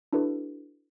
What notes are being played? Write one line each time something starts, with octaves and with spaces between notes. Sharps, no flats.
D4 E4 F#4 A4 B4